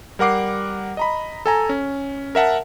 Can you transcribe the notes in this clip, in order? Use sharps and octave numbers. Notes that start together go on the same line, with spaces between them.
G3 A#4 F#5 D6 C7
D#5 A#5 B5
A4 G#5 A#5
C#4
A#4 E5 F#5 A5